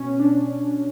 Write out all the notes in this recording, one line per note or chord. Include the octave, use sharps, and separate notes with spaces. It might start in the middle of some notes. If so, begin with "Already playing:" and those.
Already playing: B2 C#4
D4